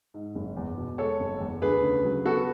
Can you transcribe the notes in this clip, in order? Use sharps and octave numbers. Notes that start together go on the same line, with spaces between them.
G#2
F#1
E2
B2
G#3 A4 C#5
F#1
E2
D2 G#4 B4
C#3
F#3
B3 F#4 A4